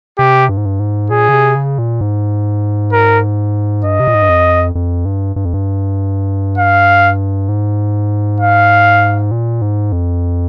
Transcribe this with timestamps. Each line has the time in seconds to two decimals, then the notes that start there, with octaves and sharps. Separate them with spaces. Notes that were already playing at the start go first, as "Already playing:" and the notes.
0.18 C3 G4
0.49 G2
0.57 G#2
0.66 G2
0.80 G#2
1.10 A#2 G#4
1.29 C#3
1.33 C3
1.56 C#3
1.78 A#2
2.01 G#2
2.93 A#4
3.84 G2 D#5
4.00 C3
4.07 A#2
4.14 G#2
4.22 G2
4.29 F2
4.75 F2
5.05 G2
5.36 G2
5.45 F2
5.54 G2
6.58 F5
7.49 G#2
8.40 F5
9.31 A#2
9.62 G#2
9.92 F2